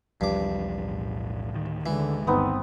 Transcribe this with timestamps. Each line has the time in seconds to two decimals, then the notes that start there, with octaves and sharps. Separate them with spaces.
0.21 B1 E2 G2 F3 D6
0.77 A2
1.52 D2 D#3
1.86 D3 E3 G#3
2.27 G1 B3 C4 D#4